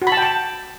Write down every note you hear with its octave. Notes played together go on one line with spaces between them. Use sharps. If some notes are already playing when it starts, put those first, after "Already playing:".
F#4
B5
A5
G5
A5